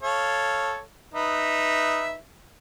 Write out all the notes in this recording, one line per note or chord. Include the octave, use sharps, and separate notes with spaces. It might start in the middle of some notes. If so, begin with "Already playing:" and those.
A4 C#5 F5
D#4 B4 E5